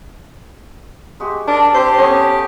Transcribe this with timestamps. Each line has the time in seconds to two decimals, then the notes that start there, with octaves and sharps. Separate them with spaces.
1.20 G#3 F#4 G4
1.47 D4 A#4 A5
1.74 C4 D4 G4 C5 D5
1.97 B3 C#4 A4